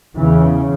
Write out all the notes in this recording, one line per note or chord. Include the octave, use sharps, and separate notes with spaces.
E2 C#3 E3